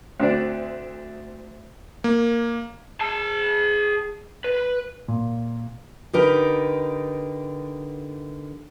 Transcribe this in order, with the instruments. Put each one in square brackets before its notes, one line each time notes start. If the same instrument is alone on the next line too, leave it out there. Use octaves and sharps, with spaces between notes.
[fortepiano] D2 C4 D4 D5
[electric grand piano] A#3
[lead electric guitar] G#4 A5
B4
[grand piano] A#2
[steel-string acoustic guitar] D3 D#4 G4 A#4 B4